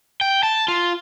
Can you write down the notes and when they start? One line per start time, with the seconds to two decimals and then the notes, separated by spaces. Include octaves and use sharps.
0.21 G5
0.43 A5
0.68 F4